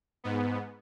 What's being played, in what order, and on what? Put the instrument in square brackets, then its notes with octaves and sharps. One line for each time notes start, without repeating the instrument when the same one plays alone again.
[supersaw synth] G#2 B3